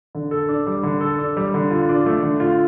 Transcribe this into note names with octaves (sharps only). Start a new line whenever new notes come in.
D3
A4
D4
G3
D3
A4
D4
G3
D3
F4
D4
A3
D3
F4